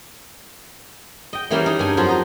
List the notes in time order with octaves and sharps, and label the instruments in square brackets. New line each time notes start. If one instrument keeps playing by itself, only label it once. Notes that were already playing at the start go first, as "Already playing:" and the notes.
[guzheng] D#5 G5
E3 G3 A#3 C#4 F5 G5
D#4
G2 G#5
F2 F3 F#3 F4 C5
D#5 A#5